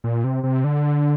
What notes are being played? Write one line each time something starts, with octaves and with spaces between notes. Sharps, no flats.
A#2
C3
C3
D3